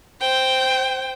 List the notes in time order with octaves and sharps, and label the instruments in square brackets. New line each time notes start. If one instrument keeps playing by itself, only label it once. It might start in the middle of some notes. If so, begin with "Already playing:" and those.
[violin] C5 G5